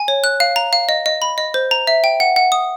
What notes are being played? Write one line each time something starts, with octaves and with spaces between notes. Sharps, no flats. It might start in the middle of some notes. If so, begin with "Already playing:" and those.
Already playing: G#5
C#5
F#6
F5
A#5
F5
D#5
D#5
B5
D#5
C5
A#5
E5
G5
F#5
F#5
D#6